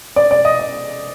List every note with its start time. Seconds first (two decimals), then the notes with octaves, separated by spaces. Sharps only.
0.16 D5
0.31 D5
0.45 D#5
0.59 D#5